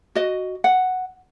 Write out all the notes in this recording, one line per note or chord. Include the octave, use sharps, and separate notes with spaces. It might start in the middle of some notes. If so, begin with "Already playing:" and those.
F#4 D#5
F#5